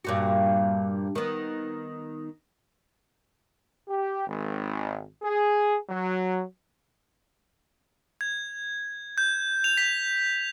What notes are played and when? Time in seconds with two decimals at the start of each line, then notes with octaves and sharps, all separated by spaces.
0.05 G2 A#2 F#4
1.15 D#3 B3
3.88 G4
4.28 G#1
5.23 G#4
5.90 F#3
8.21 G#6
9.18 G6
9.64 F7
9.77 B6